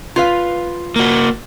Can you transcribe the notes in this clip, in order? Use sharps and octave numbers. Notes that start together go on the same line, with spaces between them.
F4 B4 F5
A#3 F#4